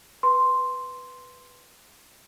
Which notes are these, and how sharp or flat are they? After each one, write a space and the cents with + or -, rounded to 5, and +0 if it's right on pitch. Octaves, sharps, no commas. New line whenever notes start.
B4 +0 C6 +0